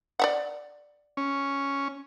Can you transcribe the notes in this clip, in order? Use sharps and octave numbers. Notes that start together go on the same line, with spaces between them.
D5 E5 F#5
C#4